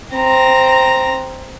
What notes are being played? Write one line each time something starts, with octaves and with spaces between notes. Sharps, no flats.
C4 A#5